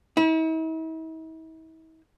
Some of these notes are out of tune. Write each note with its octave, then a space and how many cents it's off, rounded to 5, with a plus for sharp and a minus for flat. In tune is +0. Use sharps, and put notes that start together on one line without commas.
E4 -45